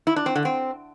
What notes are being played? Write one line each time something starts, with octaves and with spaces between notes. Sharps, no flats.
E4
D4
C4
D3
C4